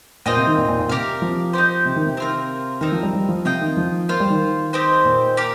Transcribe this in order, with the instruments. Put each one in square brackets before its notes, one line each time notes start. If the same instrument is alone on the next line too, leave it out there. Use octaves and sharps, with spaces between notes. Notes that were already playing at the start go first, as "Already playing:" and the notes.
[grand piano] A#2 [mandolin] C4 F4 D#5 G5
[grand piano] C3
D#3
A#2
A#2
A#2
[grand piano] C3 [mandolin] G4 A#4 F5
[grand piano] F3
[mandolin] D#4 G4 C5
[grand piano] C3
D#3
C3
[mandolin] C4 F4 A#4
[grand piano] D#3 [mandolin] C4 D#4 A#4
[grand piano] F3
G3
G3
F3
[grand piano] C3 [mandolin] F4 D#5 G5
[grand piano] D#3
F3
[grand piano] A#3 [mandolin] F4 C5 F5
[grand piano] G3
D#3
[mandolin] C4 G4 C5 D#5
[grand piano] A#2
[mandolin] G4 A#4